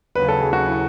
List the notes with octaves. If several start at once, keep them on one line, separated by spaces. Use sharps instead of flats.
D#2 C#3 F#3 B4
A4
G#4
F#4
E4